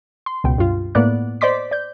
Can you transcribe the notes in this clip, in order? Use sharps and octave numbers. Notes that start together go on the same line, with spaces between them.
C6
C#2 B2 G5
G2 F4
A2 A#3 B3 D5 D6 F#6
C5 D5 D#5 C6 D6 B6
D5 G6